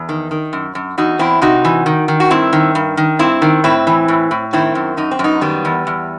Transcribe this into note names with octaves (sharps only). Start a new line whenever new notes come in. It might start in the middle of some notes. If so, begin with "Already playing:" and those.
Already playing: E2
D#3
D#3
F#2
F#2
E2 D#4 F#4
E2 C4 E4
C3 D#4 F#4
E3
D#3
D#3
F#4
G2 C4 E4
D#3
G2
D#3
G2 C4 E4
D#3
A2 C4 E4
E3
A2
A2
D#3 C4 E4
F#2
F#2 D#4
C4
F#2
B3 D#4
D#3 G3 B3
E2
E2